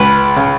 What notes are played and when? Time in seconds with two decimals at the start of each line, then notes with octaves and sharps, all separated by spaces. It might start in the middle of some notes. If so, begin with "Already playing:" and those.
Already playing: C#2 B4
0.36 C#3